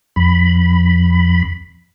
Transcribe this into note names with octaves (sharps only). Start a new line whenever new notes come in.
F2 B5